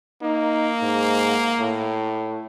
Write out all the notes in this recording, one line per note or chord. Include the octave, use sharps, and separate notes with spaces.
A#3 D#4
G#2
A2